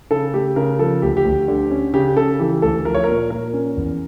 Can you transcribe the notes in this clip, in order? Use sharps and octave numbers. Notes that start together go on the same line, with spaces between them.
C#3 A4
A3 G4
C#3 A#4
F3 A4
D2 G4
G4
D2
D3
C#4
C#3 G4
C#3 A4
E3 G4
D2 A4
F3 A#4
C#5
A#2 A#4
A#2 A#4
C#4
E2